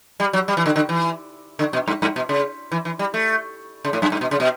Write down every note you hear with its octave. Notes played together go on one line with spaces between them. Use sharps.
G3
F#3
G3
E3
D3
D3
E3
D3
B2
G2
G2
B2
C#3
E3
E3
G3
A3
C#3
A2
F#2
G2
B2
C#3
B2